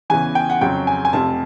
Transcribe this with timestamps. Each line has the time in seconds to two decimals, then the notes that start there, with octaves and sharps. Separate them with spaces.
0.10 E2 C#3 E3 G#5
0.35 G5
0.50 F#5
0.61 F2 C#3 F#3 G5
0.87 G#5
1.05 G#5
1.13 F1 F2 C3 A5